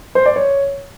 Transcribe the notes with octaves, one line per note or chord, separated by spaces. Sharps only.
C5
D5
C#5